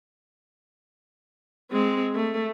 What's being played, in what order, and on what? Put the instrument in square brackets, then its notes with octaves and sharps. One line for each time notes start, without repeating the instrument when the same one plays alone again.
[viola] G#3 C4
A3